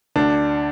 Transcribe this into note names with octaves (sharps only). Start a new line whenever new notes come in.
D2 D4